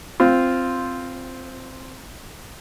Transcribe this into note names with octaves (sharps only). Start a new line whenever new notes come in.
C4 F4